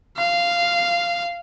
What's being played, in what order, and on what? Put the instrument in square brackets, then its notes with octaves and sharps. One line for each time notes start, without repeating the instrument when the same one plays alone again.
[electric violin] F5